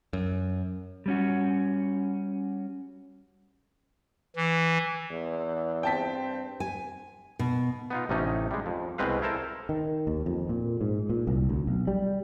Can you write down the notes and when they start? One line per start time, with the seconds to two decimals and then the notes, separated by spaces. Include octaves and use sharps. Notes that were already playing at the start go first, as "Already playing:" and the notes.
0.13 F#2
1.06 G3 C#4 F#4
4.36 E3
5.10 E2
5.83 G2 C4 G5 A5 B6
6.60 G#5
7.39 B2
7.90 B3 D#4 F4
8.09 A1 C3 A3 C#4 D#4
8.51 G3 G#3
8.66 F2
8.98 C2 B2 G#3 C4 B4 F5
9.22 E4 A4 A#4 C5 A5
9.69 D#3
10.07 D#2
10.26 F2
10.49 A#2
10.81 G#2
11.10 A#2
11.27 C2
11.49 D2
11.67 B1
11.87 G3